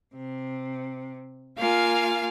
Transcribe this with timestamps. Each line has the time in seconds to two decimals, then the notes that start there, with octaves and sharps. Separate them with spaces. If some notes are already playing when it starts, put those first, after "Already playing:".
0.15 C3
1.57 A#3 F4 F5 G#5